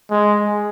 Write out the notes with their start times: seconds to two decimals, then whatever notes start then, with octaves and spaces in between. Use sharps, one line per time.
0.11 G#3